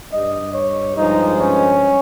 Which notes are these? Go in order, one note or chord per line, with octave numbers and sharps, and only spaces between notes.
G2 G3 D#5
C#5
G2 F3 G#3 D#4
C#4